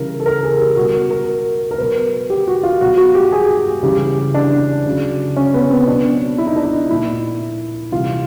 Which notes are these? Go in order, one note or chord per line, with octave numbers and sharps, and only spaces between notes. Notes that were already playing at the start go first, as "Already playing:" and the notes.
Already playing: C#3 E3 G3 A#4
A4
A#4
G#4
G4
B2 G3 F#4
A#4
A#4
A#4
B2 F#3 B4
G4
F#4
F4
B2 F#3 F#4
F#4
G4
G#4
C#3 E3 G3 G4
D4
C#3 F#3
C#4
B3
C4
B2 F#3 D4
E4
D#4
D4
D#4
A#2 F3 E4
C3 E3 G3 F4